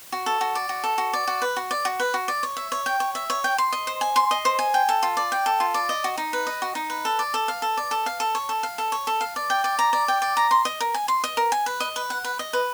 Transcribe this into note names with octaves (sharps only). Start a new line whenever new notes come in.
F#4
A4
F#4
D5
F#4
A4
F#4
D5
F#4
B4
F#4
D5
F#4
B4
F#4
D5
C#5
E5
C#5
G5
C#5
E5
C#5
G5
C6
D#5
C5
G#5
C6
D#5
C5
G#5
G5
A4
F4
D5
G5
A4
F4
D5
D#5
F#4
D#4
B4
D#5
F#4
D#4
B4
A4
D5
A4
F5
A4
D5
A4
F5
A4
C#5
A4
F5
A4
C#5
A4
F5
D5
G5
D5
A#5
D5
G5
D5
A#5
C6
D#5
A#4
G#5
C6
D#5
A#4
G#5
B4
D#5
B4
F#5
B4
D#5
B4